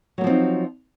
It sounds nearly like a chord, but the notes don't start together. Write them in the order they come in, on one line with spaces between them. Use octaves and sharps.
F#3 A#3 F3 C4 D#4